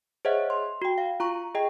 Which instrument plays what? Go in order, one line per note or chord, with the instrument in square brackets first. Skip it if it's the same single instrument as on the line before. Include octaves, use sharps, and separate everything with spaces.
[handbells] G#4 C5 C#5 D#5 E5 F#5
C6
F#4 G5
F5
F4 A#5 C#6
G#4 D#5 G5